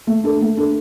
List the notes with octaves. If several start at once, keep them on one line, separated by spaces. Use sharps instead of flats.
A3
D4 A4
A3
D4 A4